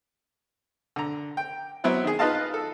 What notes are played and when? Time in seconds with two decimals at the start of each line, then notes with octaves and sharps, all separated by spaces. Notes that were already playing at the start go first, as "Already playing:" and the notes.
0.96 D3 A#5
1.37 G5
1.84 F#3 B3 C4 E4
2.04 D#3 G#4
2.19 D#4 F4 B4 D#5 F5 A5
2.54 A4